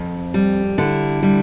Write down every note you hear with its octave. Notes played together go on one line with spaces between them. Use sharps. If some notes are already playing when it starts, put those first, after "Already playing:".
Already playing: F2 C4
G3
D3 E4
G3